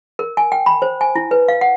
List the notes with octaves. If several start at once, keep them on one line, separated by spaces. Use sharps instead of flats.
A#4
G#5
G5
B5
C5
G#5
E4
B4
F5
F#5